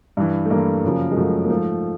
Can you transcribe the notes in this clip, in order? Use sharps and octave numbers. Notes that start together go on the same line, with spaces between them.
G2 E3
A3
G2 E3 A#3
F#2 C#3 F3
G#3
F#2 C#3 F3 A3
A#3
G#2 F3 A3